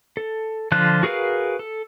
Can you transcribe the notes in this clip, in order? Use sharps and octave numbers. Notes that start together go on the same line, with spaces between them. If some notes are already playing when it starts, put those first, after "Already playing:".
A4
D3 F3 F4 C5 F#6
F#4 G#4 A#4 B4 F5
A4